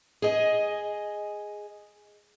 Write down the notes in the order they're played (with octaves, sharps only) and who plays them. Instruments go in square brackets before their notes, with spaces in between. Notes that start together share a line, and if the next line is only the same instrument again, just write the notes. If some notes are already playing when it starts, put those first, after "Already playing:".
[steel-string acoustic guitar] G#4 D#5 G#5